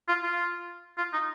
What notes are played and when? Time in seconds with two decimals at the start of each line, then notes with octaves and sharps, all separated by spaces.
0.08 F4
0.23 F4
0.98 F4
1.13 D#4